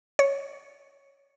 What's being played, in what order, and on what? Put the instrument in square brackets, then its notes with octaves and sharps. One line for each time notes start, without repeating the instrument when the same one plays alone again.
[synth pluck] C#5